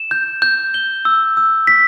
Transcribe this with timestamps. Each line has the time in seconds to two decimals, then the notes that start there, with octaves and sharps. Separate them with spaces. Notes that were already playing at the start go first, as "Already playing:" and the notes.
Already playing: E7
0.11 G6
0.42 G6
0.74 G7
1.05 E6
1.37 E6
1.67 B6